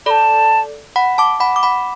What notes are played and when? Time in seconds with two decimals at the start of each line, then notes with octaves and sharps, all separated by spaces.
0.06 A4 D5 A5 B5
0.96 F#5 B5
1.18 A5 D6
1.40 F#5 B5
1.56 D6
1.63 F#5 B5